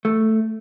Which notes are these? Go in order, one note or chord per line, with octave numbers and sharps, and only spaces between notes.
A3